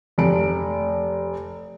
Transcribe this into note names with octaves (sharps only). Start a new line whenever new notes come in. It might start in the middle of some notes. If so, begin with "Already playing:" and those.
F1 D7